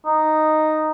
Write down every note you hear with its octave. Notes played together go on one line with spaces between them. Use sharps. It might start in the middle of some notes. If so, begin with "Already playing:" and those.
D#4